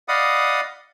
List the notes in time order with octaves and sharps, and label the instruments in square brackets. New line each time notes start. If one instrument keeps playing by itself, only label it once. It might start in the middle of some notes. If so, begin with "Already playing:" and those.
[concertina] D5 D#5 F5 F#5 B5 D#6